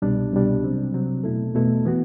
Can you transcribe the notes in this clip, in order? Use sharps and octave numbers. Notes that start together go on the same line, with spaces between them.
C2 B2 G3 D4
C2 B2 G3 D4
C3 F#3 C4
C3 F#3 C4
E2 B2 A3 E4 A4
E2 B2 A3 E4 A4
E3 B3 F#4